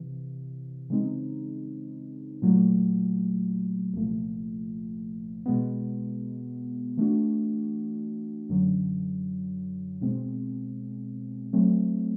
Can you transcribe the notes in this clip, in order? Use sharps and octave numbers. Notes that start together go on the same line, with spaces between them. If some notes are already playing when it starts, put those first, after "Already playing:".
Already playing: C3 E3
C#3 E3 G#3 C4 D#4
A#2 F#3 A3
C2 A#2 F3 A3
B2 G#3 B3
E3 A3 D4 F#4
F#2 D3 F#3
B2 G#3 C4
F#3 A3 C4